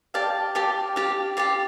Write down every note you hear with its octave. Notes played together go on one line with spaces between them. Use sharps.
G4 D5 F5 A5
G4 D5 F5 A5
G4 D5 F5
G4 D5 F5